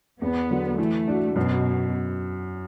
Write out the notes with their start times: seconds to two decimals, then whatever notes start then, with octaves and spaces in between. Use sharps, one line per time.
0.21 E2 B3
0.50 D3 F#3
0.78 E3 A3
1.08 D4 F#4
1.36 F#2 B2